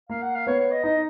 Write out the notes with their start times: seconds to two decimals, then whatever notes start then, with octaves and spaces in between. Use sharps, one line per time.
0.09 A#3 F5
0.21 F#5
0.35 F5
0.47 B3 C#5
0.59 C#5
0.71 D#5
0.84 D#4 D#5